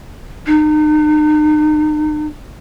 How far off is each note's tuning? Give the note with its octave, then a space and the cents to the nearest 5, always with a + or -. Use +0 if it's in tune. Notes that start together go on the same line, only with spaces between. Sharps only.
D#4 -40